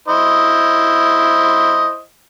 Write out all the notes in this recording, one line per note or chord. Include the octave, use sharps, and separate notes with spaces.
E4 C5 D#5